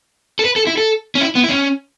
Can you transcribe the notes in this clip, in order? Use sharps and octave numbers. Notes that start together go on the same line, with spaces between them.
A4
B4
A4
E4
A4
C#4
E4
B3
E4
C#4